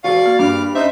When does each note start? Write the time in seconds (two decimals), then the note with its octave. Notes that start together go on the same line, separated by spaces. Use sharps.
0.04 F1 F#4 G#4 D5 F5 C#6
0.26 A#3 F6
0.39 G2 G3 D6 F6
0.75 C#4 D#4 C5 E5